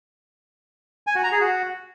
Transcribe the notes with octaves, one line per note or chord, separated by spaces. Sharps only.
G#5
F#4
A#5
G#4
F#4